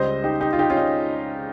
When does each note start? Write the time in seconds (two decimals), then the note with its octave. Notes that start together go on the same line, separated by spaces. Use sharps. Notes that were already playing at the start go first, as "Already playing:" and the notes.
Already playing: C#2 C#3 G3 C5 D#5
0.24 D#4 G4
0.41 D#4 G4
0.53 F4
0.59 D#4 G4
0.70 C#4 F4
0.77 D#4